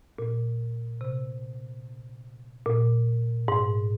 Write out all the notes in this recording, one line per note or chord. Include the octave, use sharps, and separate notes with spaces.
A#2
C3
A#2
G#2